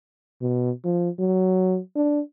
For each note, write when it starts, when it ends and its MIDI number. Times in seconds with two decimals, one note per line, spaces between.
0.42 0.71 47
0.85 1.09 53
1.19 1.79 54
1.95 2.20 62